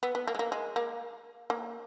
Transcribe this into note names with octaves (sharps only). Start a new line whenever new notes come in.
B3
B3
A#3
G#3
A#3
G#3
A#3
A#3